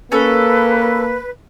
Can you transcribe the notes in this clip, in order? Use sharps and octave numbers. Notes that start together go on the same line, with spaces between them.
A#3 C#4 A4 B4